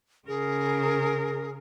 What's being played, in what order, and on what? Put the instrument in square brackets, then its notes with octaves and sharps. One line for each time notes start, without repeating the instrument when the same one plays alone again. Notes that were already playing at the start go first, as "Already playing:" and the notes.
[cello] C#3 A#4 [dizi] G#4